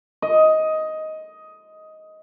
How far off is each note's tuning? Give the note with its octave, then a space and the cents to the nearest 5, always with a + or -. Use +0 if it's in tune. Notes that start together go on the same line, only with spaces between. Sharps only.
D#5 +10